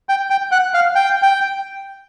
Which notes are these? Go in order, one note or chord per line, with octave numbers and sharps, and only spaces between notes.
G5
G5
F#5
F5
G5
G5